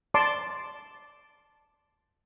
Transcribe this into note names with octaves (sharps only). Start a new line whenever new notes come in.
D5 A5 C6 D6